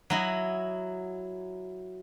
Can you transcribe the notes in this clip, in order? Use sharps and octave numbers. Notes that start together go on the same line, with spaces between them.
F#3 E4 D#5